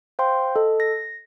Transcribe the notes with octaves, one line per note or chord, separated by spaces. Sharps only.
C5 F5 G5 C6
A4 D#5
A#6